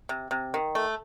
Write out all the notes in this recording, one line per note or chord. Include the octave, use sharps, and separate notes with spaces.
C3
C3
D#3
A3